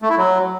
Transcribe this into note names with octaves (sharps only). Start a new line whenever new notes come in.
A3
E4
F#3